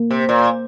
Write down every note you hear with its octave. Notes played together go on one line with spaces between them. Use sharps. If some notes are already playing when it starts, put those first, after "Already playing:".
Already playing: A#3
C3
A#2